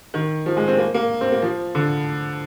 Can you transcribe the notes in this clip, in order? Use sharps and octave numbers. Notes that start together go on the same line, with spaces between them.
D#3
F3
G#3
C4
A#3
A#3
C4
A#3
F3
D3